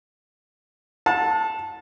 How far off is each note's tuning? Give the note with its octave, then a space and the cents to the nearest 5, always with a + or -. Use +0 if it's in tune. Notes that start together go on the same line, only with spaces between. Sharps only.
F#5 -40 A5 +0